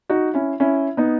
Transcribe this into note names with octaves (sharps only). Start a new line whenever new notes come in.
D#4 F#4
C#4 E4
C#4 E4
B3 D#4